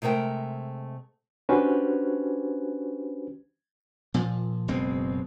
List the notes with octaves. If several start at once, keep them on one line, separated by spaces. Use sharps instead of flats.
C3 G#3 A3 A#4 G5
C#4 D4 F#4 G4 B4 C5
A#2 F3
F#1 B2 G#3 C4